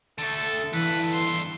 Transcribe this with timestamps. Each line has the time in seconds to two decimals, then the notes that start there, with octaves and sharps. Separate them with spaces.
0.18 D3 A3 A4
0.73 G2 E3 A4 B4
1.12 C6